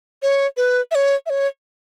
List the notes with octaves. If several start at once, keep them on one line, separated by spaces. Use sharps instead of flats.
C#5
B4
E5
C#5
E5
C#5